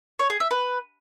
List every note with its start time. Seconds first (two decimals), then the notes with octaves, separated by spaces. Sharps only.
0.19 C#5
0.30 G#4
0.40 E5
0.51 B4